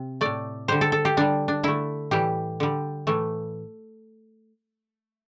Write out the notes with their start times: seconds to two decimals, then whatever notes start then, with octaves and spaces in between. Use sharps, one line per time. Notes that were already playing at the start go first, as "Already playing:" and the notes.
Already playing: C3
0.21 A2 A3 D5
0.68 D3 G3 C5
0.81 A4
0.92 A4
1.05 G4
1.17 D3 G3 D4
1.48 D4
1.63 D3 A3 E4
2.11 A2 E3 G3 G4
2.60 D3 G3
3.07 A2 E3 A3